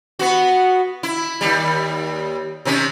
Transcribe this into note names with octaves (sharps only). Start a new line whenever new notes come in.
B3 F#4
E4
D#2 G3
C3 D#3 C#4